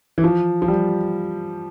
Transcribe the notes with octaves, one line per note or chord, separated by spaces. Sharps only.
E3
F3
F3
G3